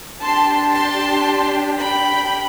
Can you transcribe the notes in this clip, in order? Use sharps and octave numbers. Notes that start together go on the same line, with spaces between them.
D4 G4 A5 C6
A5 C6
G5 B5